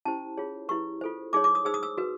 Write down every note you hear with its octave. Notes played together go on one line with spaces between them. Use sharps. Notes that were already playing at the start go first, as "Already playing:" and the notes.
C#4 E4 G4 C5 A5
F4 G#4 C#5
E4 G4 B4 C#6
F4 A4 C5
D#4 G#4 C#5 D6
D6
D#6
D#4 G#4 C5 E6
D#6
E6
F#4 B4